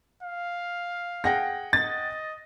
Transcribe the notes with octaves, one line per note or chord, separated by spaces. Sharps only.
F5
G#4 F#5 G5 A#6
D#5 A6